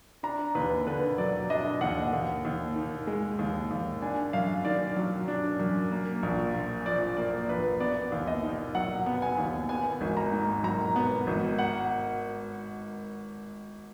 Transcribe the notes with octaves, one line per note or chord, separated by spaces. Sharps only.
D4 A#5
D#2 B4
D3 B4
F#3 D5
D4 D#5
D#2 F#5
D#2
D#2
D#3
G#3
D#2
D#2
D4 G#5
F#2 F5
D#3 D5
F#3
D4
F#2
A#3
A#1
A#2
F3 D5
A#3 D5
A#1 B4
B3 D5
D#2
D#5
D#3
F#3 F#5
B3
G#5
D#2
B3 G#5
G#1
A#5
G#2
F#3 A#5
B3
G#1
F#5